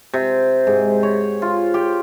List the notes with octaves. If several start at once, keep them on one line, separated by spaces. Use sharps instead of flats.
C3
G#2
C#5
F4
G4